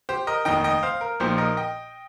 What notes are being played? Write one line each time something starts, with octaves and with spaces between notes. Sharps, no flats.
G4 C5
A#4 D#5
F1 D#2 D#3 D#5 G5
D#5 G5
C5 F5
A#4
A#1 A#2 F3 D#4 G4 C5
A#4 D#5
D#5 G5